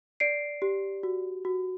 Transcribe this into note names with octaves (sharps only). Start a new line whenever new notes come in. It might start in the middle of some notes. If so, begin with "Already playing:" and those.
D5 C7 D7
G4
F#4
F#4